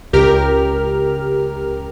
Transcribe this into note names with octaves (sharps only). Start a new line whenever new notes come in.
C#2 G4 A#4 F6